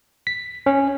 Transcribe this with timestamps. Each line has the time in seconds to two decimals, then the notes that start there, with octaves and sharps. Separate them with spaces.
0.27 B6
0.66 C#4